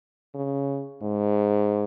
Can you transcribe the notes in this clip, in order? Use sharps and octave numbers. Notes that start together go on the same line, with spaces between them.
C#3
G#2